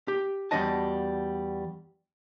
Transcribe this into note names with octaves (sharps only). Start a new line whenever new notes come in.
G4
E2 G3 D4 F#4 D#5 A5